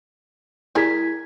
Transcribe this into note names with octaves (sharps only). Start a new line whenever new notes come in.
G3 E4 G#4 A#4 G#6 B6